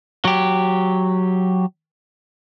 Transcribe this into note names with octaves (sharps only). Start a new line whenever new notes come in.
F#3 G4